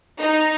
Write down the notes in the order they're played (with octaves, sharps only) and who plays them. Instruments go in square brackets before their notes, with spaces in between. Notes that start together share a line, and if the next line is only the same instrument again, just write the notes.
[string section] D#4